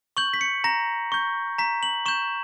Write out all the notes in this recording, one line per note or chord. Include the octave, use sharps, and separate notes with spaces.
C#6 G6 F#7
B6
C#7
A#5 A#6
C#6 G6
A#5 B6
F#7
C#6 G6 E7